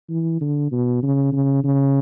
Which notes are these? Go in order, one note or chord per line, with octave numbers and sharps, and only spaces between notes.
E3
D3
B2
C#3
C#3
C#3